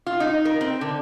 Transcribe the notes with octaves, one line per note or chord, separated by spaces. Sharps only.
F4
D#4
A#4
C4
D3